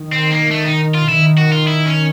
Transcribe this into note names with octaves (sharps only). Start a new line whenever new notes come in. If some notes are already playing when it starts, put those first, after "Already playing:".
Already playing: D#3
C4
A#3
A3
D#4
F4
D#3 E4
F#4
F4
E4
C#4